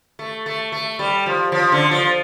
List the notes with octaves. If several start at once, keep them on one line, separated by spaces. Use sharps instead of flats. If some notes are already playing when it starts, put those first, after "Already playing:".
A3
A3
A3
G3
F3
F3
D3
F3